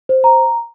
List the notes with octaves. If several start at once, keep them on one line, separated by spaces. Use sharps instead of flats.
C5
A#5